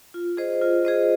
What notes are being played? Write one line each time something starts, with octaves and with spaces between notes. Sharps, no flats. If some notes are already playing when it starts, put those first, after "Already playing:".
F4
G#4 C5 D#5
F4
G#4 C5 D#5